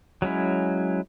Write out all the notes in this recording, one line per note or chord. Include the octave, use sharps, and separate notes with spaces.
F#3 G#3 C#4 E4